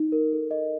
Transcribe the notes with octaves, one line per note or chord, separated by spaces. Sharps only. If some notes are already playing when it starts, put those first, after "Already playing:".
Already playing: D#4
A#4
A4
D#5